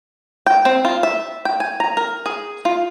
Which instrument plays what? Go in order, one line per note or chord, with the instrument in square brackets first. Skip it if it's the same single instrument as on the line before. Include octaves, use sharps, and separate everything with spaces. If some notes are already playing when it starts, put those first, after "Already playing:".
[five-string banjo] G5
C4
F4
E5
G5
G#5
A#5
A#4
G#4
F4